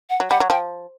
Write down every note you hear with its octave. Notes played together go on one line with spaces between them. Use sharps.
F#5
F#3
G3 F#5
F#3
F3 G5